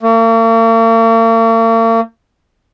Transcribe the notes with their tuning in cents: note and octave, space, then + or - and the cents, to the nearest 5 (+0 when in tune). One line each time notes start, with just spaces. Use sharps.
A#3 -45